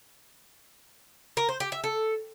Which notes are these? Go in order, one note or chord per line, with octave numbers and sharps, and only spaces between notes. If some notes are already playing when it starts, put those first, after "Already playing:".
A#4
C5
G4
E5
A4